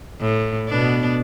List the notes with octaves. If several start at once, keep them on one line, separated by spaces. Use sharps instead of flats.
A2
B2 B3 D4